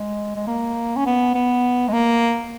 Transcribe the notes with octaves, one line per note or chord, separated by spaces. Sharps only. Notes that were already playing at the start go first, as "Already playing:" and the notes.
Already playing: G#3
G#3
A#3
C#4
B3
B3
G#3
A#3